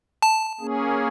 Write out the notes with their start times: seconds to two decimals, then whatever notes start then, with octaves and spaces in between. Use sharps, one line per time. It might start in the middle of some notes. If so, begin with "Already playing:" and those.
0.22 A5
0.60 A#3 C#4 G#4